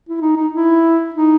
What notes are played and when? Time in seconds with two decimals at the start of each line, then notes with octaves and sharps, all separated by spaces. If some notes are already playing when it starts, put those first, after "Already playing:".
0.09 E4
0.21 D#4
0.36 D#4
0.53 E4
1.15 D#4